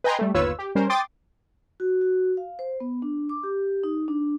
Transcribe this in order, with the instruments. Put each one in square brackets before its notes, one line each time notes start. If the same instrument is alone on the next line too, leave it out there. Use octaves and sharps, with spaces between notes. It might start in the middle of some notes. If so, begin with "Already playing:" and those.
[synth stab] B4 D#5 G5 G#5 A#5 C6
G3 A3
G1 D#2 F4 B4 C#5 E6
G4
G3 C#4 A#4 C5
G5 C6 D6 D#6 A6
[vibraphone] F#4
F#4
F5
C5
B3
D4
D6
G4
D#4
D4